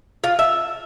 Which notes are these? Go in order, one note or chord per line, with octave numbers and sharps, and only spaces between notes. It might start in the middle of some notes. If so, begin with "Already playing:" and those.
F4
E5